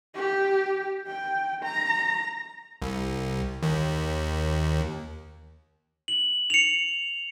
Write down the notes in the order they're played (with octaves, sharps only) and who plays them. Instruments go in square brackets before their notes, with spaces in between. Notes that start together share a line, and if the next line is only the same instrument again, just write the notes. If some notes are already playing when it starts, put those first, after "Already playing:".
[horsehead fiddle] G4
G5
A#5
[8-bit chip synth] C2
D#2
[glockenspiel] F#7
C#7 F7